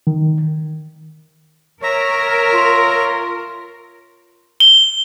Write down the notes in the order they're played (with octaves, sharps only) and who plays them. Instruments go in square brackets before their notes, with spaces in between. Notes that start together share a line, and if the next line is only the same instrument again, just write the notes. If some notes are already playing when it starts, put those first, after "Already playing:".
[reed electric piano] D#3
[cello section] A#4 [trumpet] C#5 [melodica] E5 A#5
[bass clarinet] F4
[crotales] G7